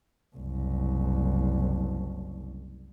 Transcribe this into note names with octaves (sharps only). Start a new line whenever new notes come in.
F#1 C2